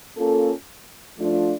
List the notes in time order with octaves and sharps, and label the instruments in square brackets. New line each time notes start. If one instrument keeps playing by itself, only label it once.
[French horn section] A#3 C#4 F4 A4
F3 A3 D4 F4